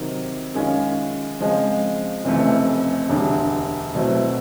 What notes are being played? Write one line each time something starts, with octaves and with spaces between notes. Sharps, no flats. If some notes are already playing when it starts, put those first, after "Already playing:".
Already playing: C3 D#3 F#3
F#2 D#3 G#3 C#4 F4
C#3 F3 G#3 C4
F1 F2 C#3 E3 A3
E1 D2 D3 G3
B2 F#3 A3 C4 E4